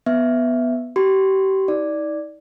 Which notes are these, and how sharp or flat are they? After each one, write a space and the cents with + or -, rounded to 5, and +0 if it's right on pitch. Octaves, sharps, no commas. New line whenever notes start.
B3 +0 E5 +0
G4 -30 C6 -35
D#4 +35 D5 +0